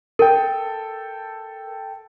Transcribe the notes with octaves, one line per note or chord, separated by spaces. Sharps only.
A4 A#4 G5